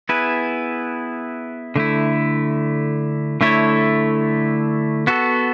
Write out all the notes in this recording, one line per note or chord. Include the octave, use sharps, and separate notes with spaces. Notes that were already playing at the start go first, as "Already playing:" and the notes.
B3 E4 G#4 B4
D3 A3 E4
D3 A3 E4 A4 C#5
B3 F#4 A4